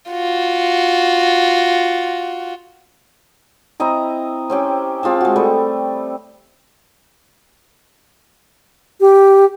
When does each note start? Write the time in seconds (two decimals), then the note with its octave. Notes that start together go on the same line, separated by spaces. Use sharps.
0.11 F4 F#4
3.80 C4 E4 D#5 A#5
4.50 C4 C#4 G4
5.03 C4 F4 G#4 A5
5.21 G#3 F#4
5.36 G3 A3
9.01 G4